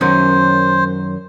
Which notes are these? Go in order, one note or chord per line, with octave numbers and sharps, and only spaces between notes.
F#2 D#3 C#4 C5